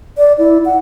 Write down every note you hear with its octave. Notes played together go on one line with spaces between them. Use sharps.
D5
E4
F#5